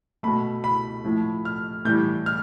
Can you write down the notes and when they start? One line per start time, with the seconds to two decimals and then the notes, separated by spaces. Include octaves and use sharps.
0.23 B2 A3 B5
0.64 B5
1.04 A2 F3 A3
1.45 F6
1.85 A2 E3 G3 G6
2.26 F6